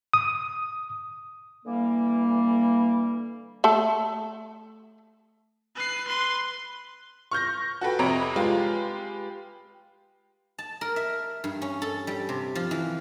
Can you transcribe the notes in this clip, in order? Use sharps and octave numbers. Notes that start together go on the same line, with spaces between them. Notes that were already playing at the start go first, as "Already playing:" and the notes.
D#6
D3 E3 G3 A#3
A3 A4
B4 C7
B4 C6
C#6 F6 G6 A#6
F#4 A4 B4 G5
F2 C3 C#5 A#5 B5 D7
G#3 F4 G4 B4
A5
A#4
E5
G2
C#4
A4
G3
C3
F3
E3